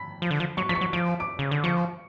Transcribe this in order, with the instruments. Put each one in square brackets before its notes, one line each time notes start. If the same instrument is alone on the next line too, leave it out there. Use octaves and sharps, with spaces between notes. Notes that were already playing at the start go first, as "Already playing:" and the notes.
Already playing: [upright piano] B5 B6
[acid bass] F3
D3
F3
[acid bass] F#3 [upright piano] C#6 C#7
[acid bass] F3 [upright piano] B6
[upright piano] C#6 C#7
[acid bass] F#3
[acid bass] F3 [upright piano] D7
[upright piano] D6 D7
[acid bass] C#3
D3
[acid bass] F3 [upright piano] C#6 C#7